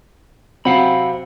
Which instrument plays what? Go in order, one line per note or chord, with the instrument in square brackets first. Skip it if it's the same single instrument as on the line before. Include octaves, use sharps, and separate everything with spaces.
[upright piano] C3 F#3 C4 [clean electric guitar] F5 F#5 B5